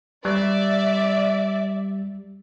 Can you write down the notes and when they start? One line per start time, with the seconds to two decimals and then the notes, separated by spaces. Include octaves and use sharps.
0.25 G3 D5 E5